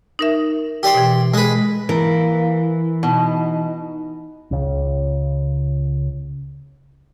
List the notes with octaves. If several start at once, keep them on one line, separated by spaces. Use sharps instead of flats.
D#4 A#4 E5
G4 D5 C6
B2 E3
G#3 B4
E3 A#3 A#4
B2 D#4
C#2 C#3